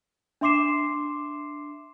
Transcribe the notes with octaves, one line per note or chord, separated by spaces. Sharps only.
D4 E5 C6 D6 C7 E7